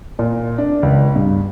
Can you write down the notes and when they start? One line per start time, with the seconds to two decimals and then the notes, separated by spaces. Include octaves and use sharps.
0.19 A#2
0.58 D4
0.83 C#2
1.16 G2